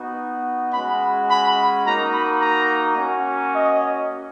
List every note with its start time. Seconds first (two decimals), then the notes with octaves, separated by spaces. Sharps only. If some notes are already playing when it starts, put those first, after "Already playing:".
Already playing: B3 D#4 F#4
0.73 G#3 C#4 F#4 B5
1.30 B5
1.85 A#3 D#4 F#4 A#5
2.14 B5
2.41 A#5
2.97 A#3 C#4 F#4
3.54 D#5